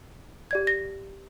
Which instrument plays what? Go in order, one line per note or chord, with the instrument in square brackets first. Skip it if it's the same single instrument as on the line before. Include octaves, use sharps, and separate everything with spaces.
[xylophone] G4 D5 G#6
A#6